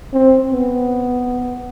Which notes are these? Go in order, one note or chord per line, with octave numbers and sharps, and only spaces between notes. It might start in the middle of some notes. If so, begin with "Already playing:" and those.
C4
B3